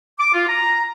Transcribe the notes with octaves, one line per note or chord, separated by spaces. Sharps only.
D6
F4
A#5